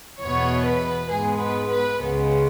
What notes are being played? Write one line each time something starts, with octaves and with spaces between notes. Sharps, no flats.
E2 B2 B3 C#5
B4
G#2 G#3 B3 G#4
B4
B4
C#2 C#3 G#3 B3